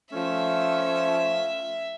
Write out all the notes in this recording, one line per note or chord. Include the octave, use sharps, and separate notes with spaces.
F3 A3 C#4 E5